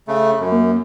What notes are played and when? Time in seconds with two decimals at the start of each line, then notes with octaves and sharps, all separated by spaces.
0.08 C#3 A3
0.40 F#2
0.52 A#3